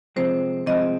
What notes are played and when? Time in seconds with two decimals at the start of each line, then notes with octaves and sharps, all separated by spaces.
0.16 C3 F3 G#3 C4 C5
0.66 C3 F3 G#3 C4 D#5